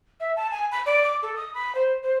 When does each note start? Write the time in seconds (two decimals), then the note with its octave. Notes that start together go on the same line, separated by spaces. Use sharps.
0.20 E5
0.36 A5
0.51 G#5
0.72 B5
0.86 D5
1.04 D6
1.23 A4
1.36 D#6
1.54 B5
1.75 C5
2.03 C5